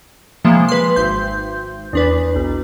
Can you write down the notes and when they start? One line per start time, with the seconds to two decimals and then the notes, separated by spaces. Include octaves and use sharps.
0.44 C3 E3 F3 G#3 A#3
0.68 B4 C6
0.96 G#1 C6 G6
1.93 E2 D4 B4
2.36 B1